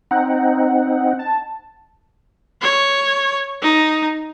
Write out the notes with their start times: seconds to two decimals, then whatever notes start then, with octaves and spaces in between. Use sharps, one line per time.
0.11 C4 D#4 F#5
1.19 A5
2.62 C#5
3.62 D#4